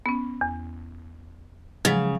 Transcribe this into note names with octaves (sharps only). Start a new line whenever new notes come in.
B3 C#4
E2
C#3 F3 F#3 G#3